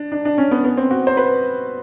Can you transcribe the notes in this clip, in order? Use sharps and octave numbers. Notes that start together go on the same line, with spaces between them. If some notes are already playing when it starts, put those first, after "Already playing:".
Already playing: D4
D4
D4
C#4
B3
B3
C4
F#4
C5
B4